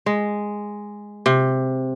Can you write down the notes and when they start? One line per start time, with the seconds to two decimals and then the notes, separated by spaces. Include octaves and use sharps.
0.06 G#3
1.26 C3